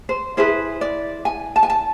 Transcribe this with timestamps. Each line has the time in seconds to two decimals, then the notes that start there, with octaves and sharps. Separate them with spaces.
0.09 C5
0.37 E4 G#4 B4 C5
0.81 D5
1.25 G#5
1.56 A5
1.63 G#5
1.70 A5